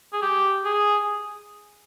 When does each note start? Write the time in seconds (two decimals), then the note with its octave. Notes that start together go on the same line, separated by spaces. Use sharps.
0.13 G#4
0.22 G4
0.65 G#4